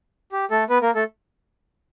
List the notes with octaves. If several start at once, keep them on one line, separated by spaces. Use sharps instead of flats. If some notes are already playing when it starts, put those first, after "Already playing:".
G4
A3 A4
B3 B4
A#3 A#4
A3 A4